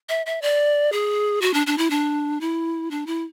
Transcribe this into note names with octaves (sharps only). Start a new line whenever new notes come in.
E5
E5
D5
G#4
F#4
D4
D4
E4
D4
E4
D4
E4